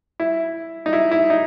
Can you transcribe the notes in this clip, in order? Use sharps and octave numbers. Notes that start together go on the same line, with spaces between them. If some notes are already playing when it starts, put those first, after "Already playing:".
E4
D#4
E4
E4
D#4